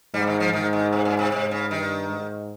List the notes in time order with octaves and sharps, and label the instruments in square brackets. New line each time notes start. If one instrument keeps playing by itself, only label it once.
[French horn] G#2 [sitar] G3
[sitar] D#3
F3
[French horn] G#2 [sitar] D#3
[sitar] D#3
C3
A#2
C3
[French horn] G#2 [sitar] C3
[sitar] C#3
[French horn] G2 [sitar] D#3
[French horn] G#2